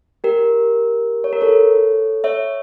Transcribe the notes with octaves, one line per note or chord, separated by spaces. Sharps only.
G4 A#4
C#5
A#4
A4 C#5
C#5 E5